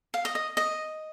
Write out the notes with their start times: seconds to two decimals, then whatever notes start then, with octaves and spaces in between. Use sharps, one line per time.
0.14 F5
0.25 D#5
0.35 D#5
0.57 D#5